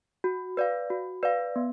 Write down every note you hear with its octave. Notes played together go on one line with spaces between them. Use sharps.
F#4
B4 D5 F5
F#4
B4 D5 F5
B3